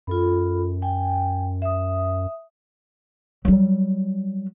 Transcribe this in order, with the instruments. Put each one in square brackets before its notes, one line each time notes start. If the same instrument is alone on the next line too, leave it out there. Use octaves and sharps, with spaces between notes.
[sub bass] F#2 [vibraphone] F4 A4 B5
[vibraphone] G5 G#5
E5 D#6
[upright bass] F#3 G3